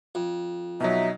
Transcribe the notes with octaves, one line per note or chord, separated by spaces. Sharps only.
F2
B2 F#3 D#4 E5